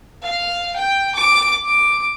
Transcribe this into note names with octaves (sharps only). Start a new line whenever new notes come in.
F5
G5
D6
D6